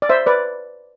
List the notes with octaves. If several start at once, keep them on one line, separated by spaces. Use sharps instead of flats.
D5
C5 E5
B4 D5